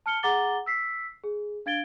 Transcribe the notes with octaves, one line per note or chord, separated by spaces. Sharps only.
A5 F6 C#7 G7
G#4 F#5 A#5 D6 A6 G7
E6 B6 C7
G#4
D4 F5 G#6 A6 D7 G7